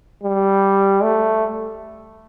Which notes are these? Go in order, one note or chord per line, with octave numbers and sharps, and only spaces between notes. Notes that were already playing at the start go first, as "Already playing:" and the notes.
G3
A3